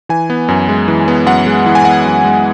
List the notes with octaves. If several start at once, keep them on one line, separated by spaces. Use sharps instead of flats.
E3 G#5
B3
F#2
G#3
E3
B3
F#2 F#5
G#3
E3
G#5
B3 F#5
F#2
G#3